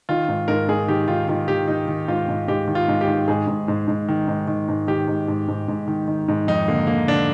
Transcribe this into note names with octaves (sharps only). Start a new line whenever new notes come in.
D#3 F4
G#2
G#2 A#4
G#2 G#4
D#3 G4
D#3 F4
D#3 F4
D#3 G4
D#3 D#4
D#3
G#2 F4
G#2
G#2 G4
D#3
F4
G#2
G4
D#3
G#2 G#4
G#2
G#2
G#2
D#3
G#2
D#3
G#2
D#3 G4
G#2
G#2
G#2
G#2
D#3
D#3
G#2
F2 D#4
D3 A#3
D3 A#3
D3 D4